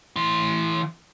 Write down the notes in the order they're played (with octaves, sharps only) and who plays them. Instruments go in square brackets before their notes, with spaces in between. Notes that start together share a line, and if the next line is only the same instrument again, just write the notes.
[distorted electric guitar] E3 C6